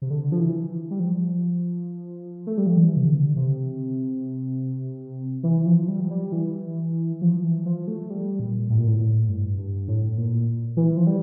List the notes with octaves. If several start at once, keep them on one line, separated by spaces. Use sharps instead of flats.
C3
D3
F3
E3
G3
F3
A3
G3
F3
E3
C3
D3
C3
E3
F3
G3
F3
G3
E3
F3
E3
F3
A3
G3
A#2
A2
A#2
A2
A2
G2
G2
A2
A#2
E3
F3
G3